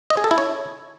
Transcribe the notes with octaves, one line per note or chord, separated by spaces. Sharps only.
D#5
G#4
A4
E4
C#5